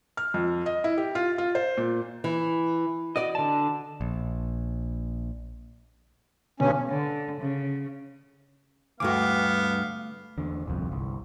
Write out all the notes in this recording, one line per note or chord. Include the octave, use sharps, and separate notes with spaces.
F6
F2
D#5
E4
G4
F4
F4
C5
A#2
E3
F#4 D5 D#5
D3 A5
A#1
G2 B2 D3 C#4
D3
C#3
D2 G2 A3 B3 F#4 F5 D6
E2 D3
D1 C2 F2
G1 C2